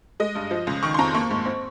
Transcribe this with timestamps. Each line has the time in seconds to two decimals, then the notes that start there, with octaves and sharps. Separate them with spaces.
0.20 G#3 D#5
0.35 G2
0.51 F3
0.67 C#2
0.83 D#3 C#6
0.94 C6
0.99 F2 A#5
1.14 A#3 C#6
1.31 G#2
1.46 C4